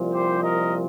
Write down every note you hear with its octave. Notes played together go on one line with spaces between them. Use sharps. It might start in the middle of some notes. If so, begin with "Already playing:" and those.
Already playing: C2 A#2 F3
G4 C5
A#4 D#5